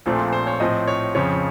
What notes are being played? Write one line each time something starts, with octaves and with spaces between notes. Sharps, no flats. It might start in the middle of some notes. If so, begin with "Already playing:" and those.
A#1 A#2 F3 A3 C4 C5
C5
C#5
A2 F3 C4 D#5
C#5
F2 C#3 F3 C#5